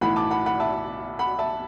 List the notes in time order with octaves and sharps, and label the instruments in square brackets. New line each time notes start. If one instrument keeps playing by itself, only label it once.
[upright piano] B1 A2 E3 F#5 B5
A5 D6
F#5 B5
F#5 B5
E5 A5
F#5 B5
E5 A5